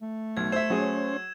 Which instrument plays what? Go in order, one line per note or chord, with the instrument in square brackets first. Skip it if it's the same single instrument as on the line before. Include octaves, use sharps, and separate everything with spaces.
[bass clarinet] A3
[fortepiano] B1 [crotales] G#6
[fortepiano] C5 E5 [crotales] E6 G#6 E7
[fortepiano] F#3 G#4 [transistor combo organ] C#4 C5